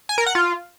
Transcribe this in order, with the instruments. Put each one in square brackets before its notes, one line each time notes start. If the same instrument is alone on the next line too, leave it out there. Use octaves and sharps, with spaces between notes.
[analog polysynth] G#5
A#4
F#5
F4